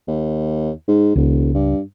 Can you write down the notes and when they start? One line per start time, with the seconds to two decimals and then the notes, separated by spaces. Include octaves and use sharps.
0.08 D#2
0.88 G#2
1.16 E1 C#2
1.54 G2